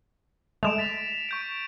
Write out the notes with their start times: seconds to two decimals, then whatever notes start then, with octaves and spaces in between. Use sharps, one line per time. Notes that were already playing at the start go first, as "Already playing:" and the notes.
0.63 G#3 A3 D7 E7 F7
0.78 A6 B6 F7
1.29 C#6 G6 D7